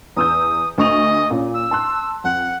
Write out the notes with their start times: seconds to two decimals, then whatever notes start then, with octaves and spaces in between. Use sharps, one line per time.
0.17 E2 D#6 E6 G6
0.78 D2 D#5 C#6 F7
1.30 A#2 C#4
1.54 E6
1.71 A5 C6 F#6
2.24 F2 F#5